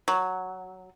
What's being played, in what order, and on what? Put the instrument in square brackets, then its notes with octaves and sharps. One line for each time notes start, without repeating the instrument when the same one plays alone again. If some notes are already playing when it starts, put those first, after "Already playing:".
[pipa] F#3